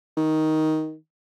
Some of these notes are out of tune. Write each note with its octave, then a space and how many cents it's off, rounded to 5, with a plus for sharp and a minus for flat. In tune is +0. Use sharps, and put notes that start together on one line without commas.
D#3 +10